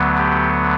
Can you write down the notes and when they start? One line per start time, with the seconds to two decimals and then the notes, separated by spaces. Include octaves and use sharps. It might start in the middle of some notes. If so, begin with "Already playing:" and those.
Already playing: D2 D3 F#3 B3
0.17 G4